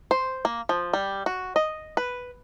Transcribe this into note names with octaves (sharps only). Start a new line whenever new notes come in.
C5
A#3
F3
G3
F#4
D#5
B4